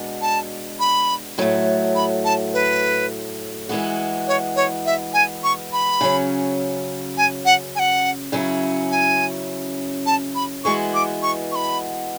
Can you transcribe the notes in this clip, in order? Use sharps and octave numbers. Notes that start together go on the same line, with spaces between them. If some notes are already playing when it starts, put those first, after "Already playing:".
Already playing: B2 G#3 D4 F#4
A5
B5
A2 F#3 A3
B5
A5
B4
E3 G#3 B3 F#4
C#5
C#5
E5
G#5
C#6
B5
C#3 F#3 C#4
G#5
F#5
G#5
F#5
C#3 F#3 C#4 E4
G#5
A5
B5
E3 G#3 B3 F#4 C#6
D6
C#6
C#6
B5